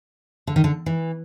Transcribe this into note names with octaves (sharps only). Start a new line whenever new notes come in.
D3
D#3
D3
E3